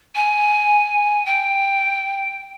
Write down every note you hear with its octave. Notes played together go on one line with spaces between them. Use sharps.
G#5
G5